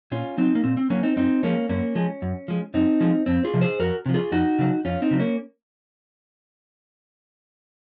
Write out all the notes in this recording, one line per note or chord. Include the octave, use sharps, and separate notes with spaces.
A#2 C#4 F4
F#3 C4 D#4
A#3
A#2 C4
C4
F#3 A#3 C#4
C4 D#4
F#2 C4 D#4
F3 G#3 A#3 C#4
F#2 A#3 C#4
F3 G#3
F#2
F3 G#3
F#2 C4 D#4
F3 G#3
F2 C4
F4 G#4
C3 F3
G#4 C5
F2 F#4 A#4
C3 F3
F4 G#4
F2 D#4 F#4
C#3 F#3
F2 C#4 F4
C4 D#4
C#3 F#3
A#3 C#4